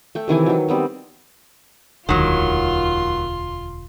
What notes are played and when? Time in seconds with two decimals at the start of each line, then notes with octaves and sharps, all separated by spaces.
0.15 A3 G5
0.28 C3 D#3 E3 G#5
0.46 D#3 F#3
0.68 G3 B3 C4
2.09 E1 D2 D#3 F#3 F4 C6